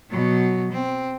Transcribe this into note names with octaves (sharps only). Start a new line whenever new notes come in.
B2 F#3
C4